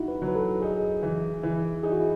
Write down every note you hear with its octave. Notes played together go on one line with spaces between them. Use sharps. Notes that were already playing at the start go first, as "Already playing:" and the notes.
Already playing: D#4 E4 F#4
B4
F#3
B4
A4
D#4 G#4
E3
E3 E4
D#4 G#4
F#4
E4